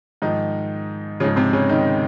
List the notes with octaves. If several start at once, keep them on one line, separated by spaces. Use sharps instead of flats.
G#2 D#3 F3 D#4
G#2 C#3 F3 C#4
C3 C4
C#3 C#4
D#3 D#4